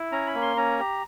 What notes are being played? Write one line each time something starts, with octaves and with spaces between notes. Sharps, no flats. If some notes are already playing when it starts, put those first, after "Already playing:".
Already playing: E4
C#4 A#5
B5
A#3
C6
C#4 A#5
G4